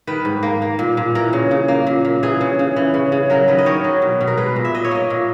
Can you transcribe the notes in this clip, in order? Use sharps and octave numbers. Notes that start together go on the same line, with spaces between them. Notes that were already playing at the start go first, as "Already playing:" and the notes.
D#3 B4
G#2
A#3
A#3
A#2
A#2
E3 A#4
C#3
C#3
A#3
A#2
A#2
E3 G#4
C#3
C#3
E3
C#3
C#3
F#3 A#4
D#3 B4
D#5
D#3 C#5
F#3
B2
B2
A#4
G#3 B4
A#2
E5
A#2 D#5
C#5
A#3 D#5
A#2